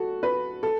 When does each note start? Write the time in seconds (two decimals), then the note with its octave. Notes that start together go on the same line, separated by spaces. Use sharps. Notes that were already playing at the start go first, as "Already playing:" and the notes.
Already playing: F#4 A4
0.23 B4
0.63 A4